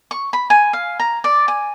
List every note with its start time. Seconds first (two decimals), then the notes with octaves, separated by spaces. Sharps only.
0.11 C#6
0.33 B5
0.50 G#5
0.73 F5
1.00 A#5
1.24 D5
1.48 G#5